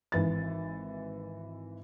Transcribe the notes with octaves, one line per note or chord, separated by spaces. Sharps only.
G#1 E3 A6